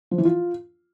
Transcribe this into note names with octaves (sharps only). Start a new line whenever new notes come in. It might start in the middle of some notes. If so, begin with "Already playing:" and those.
F3
E3
F4